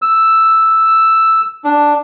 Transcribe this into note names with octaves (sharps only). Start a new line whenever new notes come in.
E6
D4